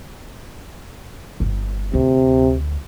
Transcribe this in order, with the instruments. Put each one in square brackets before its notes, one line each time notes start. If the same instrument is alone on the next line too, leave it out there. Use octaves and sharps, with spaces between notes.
[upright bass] G1
[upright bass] D2 [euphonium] C3